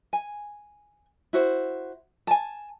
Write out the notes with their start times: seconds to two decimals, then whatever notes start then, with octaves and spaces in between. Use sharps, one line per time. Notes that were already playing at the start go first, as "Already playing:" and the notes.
0.13 G#5
1.33 E4 F#4 C5
2.27 G#5 A5